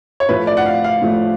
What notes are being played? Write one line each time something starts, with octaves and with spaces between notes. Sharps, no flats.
C#5
A2 F3 A3 B4
D5
F#5
F5
F5
A2 F3 A3